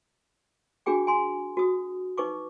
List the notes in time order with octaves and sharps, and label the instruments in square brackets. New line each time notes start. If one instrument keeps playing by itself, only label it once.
[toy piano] D4 F#4 G#4 G5 D6
G#5 C6
F#4 D#6
D#4 B4 C#6 D6